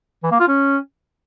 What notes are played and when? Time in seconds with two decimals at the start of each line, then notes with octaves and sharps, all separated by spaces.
0.23 E3
0.32 A#3
0.40 F4
0.48 C#4